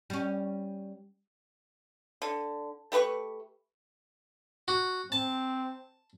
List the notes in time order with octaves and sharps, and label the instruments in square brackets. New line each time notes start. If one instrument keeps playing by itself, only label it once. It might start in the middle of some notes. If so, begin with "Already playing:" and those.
[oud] G3 C#4
[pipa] D3
A3 G4 B4 C#6
[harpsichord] F#4
[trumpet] C4 [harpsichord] A5